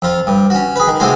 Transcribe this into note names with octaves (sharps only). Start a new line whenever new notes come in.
F2 F4
G2
C#4 F#4
G#4 B4
D#3
A2 C3 G#3 F#4 G#5 C6